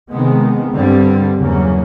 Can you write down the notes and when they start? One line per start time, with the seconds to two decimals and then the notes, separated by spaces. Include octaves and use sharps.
0.12 C3 D#3 G#3 B3
0.74 G2 D3 G3 C4
1.37 E2 C#3 F#3 A#3 C#4